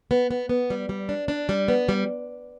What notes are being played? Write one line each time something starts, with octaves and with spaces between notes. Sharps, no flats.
B3
B3
B3
G3
G3
D4
D4
G3
B3
G3